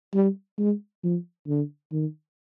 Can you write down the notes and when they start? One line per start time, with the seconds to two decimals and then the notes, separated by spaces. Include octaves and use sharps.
0.14 G3
0.59 G#3
1.03 F3
1.48 D3
1.92 D#3